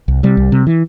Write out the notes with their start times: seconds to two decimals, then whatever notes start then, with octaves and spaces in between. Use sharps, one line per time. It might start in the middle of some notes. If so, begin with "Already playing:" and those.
0.08 C2
0.23 C3 G3
0.37 C2
0.52 C3
0.67 E3